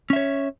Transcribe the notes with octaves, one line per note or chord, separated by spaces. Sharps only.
C#4 C#5 E5